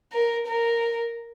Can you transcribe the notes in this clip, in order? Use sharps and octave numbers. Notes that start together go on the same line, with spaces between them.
A#4
A#4